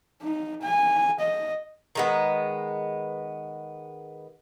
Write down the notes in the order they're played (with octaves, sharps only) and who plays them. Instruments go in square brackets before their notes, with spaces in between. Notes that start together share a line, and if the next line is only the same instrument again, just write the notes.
[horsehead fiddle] D#4
G#5
D#5
[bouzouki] D#3 G#3 B3